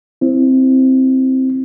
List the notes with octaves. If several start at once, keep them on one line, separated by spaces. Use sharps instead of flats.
C4 E4